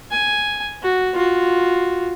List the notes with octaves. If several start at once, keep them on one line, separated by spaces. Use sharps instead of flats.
G#5
F#4
F4 F#4